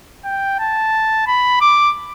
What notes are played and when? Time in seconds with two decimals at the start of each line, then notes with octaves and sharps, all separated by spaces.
0.25 G5
0.59 A5
1.27 B5
1.61 D6